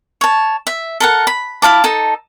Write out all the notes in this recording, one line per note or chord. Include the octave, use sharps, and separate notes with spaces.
C#5 A5
E5
A4 A#4 F#5
B5
E4 F5 A5 D6
D#4 A4 A5